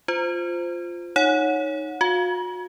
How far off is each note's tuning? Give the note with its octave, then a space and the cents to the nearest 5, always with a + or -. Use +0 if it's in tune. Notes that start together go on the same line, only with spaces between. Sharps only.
F4 +0 C5 -15
D#4 +0 C#5 +0 F#5 -20
F#4 -40 F5 +0